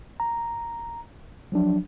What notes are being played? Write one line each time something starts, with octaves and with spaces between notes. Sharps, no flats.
A#5
F3 F#3 D4